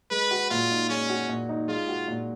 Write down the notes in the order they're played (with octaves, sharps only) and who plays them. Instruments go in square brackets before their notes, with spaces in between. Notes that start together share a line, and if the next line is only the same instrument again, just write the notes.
[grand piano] G#3 [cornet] B4
[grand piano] F#4
[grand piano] A#2 [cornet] F4
[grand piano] D#4
[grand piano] G#3 [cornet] C#4
[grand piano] F#4
A#2
D#4
[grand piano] G#3 [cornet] F4
[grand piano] F#4
A#2